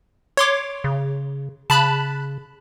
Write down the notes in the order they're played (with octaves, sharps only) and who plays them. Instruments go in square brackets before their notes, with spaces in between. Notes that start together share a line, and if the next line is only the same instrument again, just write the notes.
[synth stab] C#5 C6 D6
[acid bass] C#3
[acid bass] C#3 [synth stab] A5 B5 F#6